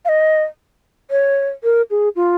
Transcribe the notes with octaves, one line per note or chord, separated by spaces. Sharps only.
F5
D#5
C#5
A#4
G#4
F4